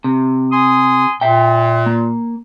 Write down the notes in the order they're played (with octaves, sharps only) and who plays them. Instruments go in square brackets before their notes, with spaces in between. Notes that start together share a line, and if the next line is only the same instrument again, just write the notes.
[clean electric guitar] C3
[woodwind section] G#5 C6 D#6
[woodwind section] A#2 [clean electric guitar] E5 G5
[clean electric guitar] A#3